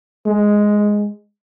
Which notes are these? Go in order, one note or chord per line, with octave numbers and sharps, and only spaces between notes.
G#3